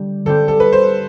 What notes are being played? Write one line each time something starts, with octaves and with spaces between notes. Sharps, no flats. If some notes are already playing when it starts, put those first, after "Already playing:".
Already playing: D3 G3 G4
D3 G3 C4 G4 A4
A4
B4
C5